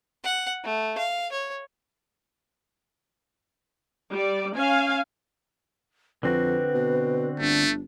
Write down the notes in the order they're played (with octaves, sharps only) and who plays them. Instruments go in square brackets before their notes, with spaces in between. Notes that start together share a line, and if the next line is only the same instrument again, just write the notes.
[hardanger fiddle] F#5
A3
F5
C#5
[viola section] G3 D5
C#4 F5 G#5
[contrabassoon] F2 [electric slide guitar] D3 C4 F#4 [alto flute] B4
[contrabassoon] B2
[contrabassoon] G1 [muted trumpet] A3 [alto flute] D4